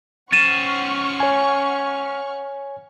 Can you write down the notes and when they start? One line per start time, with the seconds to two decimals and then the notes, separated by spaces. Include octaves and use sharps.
0.32 C#4 C5 F#5 C#6 F6 A6 D#7 E7
1.20 C#5 G#5